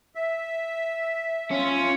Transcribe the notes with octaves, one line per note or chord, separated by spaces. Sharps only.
E5
C#4 F4